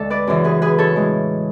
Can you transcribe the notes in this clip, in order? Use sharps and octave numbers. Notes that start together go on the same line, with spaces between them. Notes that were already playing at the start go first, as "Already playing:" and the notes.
Already playing: D2 D3 G#3 A4
B4 D5
F#2 C#3 E3
G#4 B4
G#4 B4
A4 C#5
A2 E3 G#3